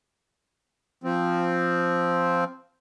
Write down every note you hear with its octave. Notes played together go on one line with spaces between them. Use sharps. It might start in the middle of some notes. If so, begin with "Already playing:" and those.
F3 C4